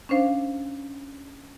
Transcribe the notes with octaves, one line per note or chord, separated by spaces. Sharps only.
C#4 D4 C5 F5